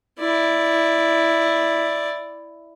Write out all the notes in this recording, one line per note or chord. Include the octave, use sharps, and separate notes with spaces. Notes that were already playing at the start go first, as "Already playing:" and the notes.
E4 D5